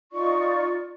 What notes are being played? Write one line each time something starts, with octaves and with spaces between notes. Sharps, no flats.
D#4 F4 D5 C#6